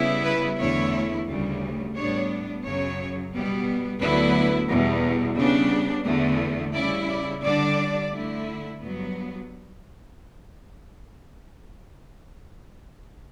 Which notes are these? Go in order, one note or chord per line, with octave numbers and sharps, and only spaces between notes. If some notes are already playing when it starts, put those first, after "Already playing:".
Already playing: C#3 G3 B3 E4
B4
E2 D3 A3 E4 C#5
D2 C#3 G3
A2 G3 B3 D4 C#5
F#2 C#3 F#3 C#5
B2 G3 B3
D2 D3 F#3 B3 E4 B4
E2 B2 G3
C#3 G3 B3 D4
E2 D3 A3
C#3 G3 C#4 E4 D5
D5
D3 G3 D4 D5
D3 A3 E4
G2 F#3 B3